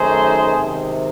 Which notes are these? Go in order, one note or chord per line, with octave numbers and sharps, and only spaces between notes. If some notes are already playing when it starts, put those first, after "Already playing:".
Already playing: F#2 D#3 A3 D#4 G#4 C5
C3 D#3 G#3